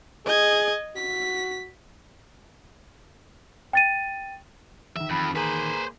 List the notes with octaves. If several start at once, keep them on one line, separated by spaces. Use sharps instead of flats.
G#4 D#5 G#6
F#4 B6
G5 A6 D#7
E2 D#3 E5
F2 B5
A#3 G#4 B4 C5 A#5